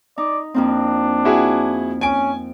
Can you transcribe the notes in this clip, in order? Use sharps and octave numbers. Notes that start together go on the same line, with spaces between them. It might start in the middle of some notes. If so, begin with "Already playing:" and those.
D#4 D5
F2 A#3 C4 D4
E4 F#4 G#4
C#4 G#5 D7